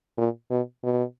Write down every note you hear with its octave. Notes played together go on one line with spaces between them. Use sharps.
A#2
B2
B2